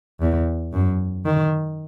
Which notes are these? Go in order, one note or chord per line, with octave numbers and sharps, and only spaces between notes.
E2
F#2
D#3